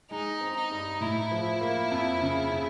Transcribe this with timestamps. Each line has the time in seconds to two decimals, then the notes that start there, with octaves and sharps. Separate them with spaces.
0.11 G#3 D#4
0.40 C4
0.56 D#4
0.71 G2
1.01 A2 E4
1.31 F3
1.61 A#3
1.91 F2
2.21 C#3
2.51 C#3